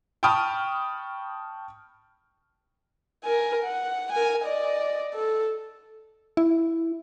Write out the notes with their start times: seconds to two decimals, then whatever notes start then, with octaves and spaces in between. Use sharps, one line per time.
0.23 G5 A5 B5 C#6 D#6 F6
3.24 A#4 G#5
3.63 F#5
4.12 A#4 G#5
4.44 D5 D#5
5.14 A4
6.37 E4